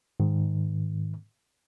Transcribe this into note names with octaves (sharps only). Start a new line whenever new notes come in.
G#2 D#3